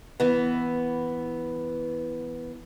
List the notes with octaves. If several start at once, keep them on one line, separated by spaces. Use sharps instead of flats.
E3 B3